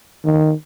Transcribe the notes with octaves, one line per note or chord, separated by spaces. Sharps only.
D#3